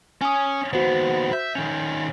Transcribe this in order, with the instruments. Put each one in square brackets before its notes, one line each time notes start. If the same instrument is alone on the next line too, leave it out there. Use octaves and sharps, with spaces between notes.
[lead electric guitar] C#4 [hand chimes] G#5 D#6
[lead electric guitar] D#2 B3 [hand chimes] F#4 C5
[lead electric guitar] E5 [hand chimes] G6
[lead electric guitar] D#3 C#4